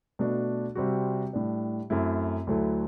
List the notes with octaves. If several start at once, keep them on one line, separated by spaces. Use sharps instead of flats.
B2 A3 D4 F#4
C3 G3 C4 F#4
A2 G3 D4
F#2 F#3 A3 C4 E4
D2 D3 F#3 A3 E4